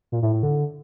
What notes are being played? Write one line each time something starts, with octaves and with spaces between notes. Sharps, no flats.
A#2
A2
A2
D3